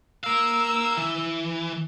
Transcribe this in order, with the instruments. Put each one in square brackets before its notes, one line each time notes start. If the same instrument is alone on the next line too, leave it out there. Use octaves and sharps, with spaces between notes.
[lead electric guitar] A#4 F5 [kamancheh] E6
[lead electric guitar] E3